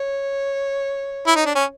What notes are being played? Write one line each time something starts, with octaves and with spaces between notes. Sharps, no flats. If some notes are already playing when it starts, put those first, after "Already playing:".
Already playing: C#5
E4
D#4
D4
C#4